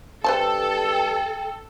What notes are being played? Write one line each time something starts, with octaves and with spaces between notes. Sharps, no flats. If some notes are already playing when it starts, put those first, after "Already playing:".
G2 A4 B4 C5 G5 A5